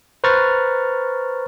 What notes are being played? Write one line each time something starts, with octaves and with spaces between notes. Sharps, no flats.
B4 C5 A#5 C#6 F6 A6